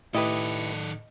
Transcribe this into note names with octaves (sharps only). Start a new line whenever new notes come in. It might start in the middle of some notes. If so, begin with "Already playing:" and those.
A2 D#3 E4 G4 A4 B4 D#5